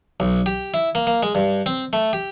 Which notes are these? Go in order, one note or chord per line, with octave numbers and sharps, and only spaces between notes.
B1
G4
E4
A#3
A#3
G#3
G2
C4
A3
G4